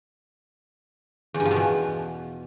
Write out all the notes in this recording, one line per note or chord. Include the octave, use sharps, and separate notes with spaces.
E2
G2
F3
B2
E2